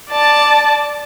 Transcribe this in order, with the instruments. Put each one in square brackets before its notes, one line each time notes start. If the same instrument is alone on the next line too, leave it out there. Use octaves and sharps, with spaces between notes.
[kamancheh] D5 A5